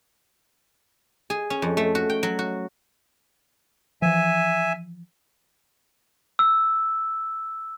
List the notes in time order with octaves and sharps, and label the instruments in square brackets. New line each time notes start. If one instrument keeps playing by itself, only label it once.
[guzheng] G#4
C#4
F2
A3
F#4
G5
F#3
F#4
[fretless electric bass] E3 F3 [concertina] E5 G#5
[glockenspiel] E6